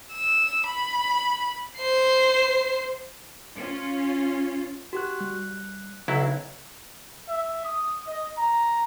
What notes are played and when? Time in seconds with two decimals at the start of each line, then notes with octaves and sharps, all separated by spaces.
0.12 E6
0.67 B5
1.78 C5 C7
3.56 C#4 F4
4.93 F#4 G4 F#6
5.21 G3 F#6
6.08 B1 C#3 F#3 E4
7.27 E5
7.64 D#6
8.07 D#5
8.37 A#5